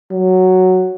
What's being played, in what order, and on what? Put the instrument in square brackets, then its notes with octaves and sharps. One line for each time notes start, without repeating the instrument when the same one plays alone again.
[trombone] F#3